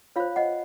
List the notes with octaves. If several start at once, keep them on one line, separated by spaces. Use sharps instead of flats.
F4 C5 C#5 F5
D#5 F#5